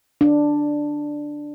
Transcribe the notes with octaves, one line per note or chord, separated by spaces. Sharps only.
D4